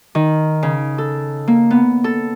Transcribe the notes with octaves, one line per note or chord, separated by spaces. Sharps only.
D#3
C#3
A4
A#3
B3
A4